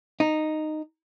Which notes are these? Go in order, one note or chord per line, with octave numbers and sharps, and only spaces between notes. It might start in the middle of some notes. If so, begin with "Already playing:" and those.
D#4